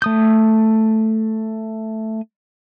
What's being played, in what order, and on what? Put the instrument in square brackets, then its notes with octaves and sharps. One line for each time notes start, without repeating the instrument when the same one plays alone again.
[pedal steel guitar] A3 D#6 G6